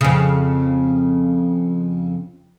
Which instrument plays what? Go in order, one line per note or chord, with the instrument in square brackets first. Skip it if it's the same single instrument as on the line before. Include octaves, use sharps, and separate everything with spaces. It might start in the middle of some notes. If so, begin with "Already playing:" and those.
[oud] F2 C#3